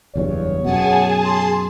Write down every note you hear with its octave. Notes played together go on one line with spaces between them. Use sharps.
F#1 E2 G2 C#5
F#2 B2 G#4 F#5 G#5 A5
C6